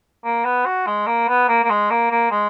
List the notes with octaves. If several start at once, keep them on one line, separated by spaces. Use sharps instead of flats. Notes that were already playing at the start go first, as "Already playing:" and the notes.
A#3
B3
F#4
G#3
A#3
B3
A#3
A#3
G#3
A#3
A#3
G#3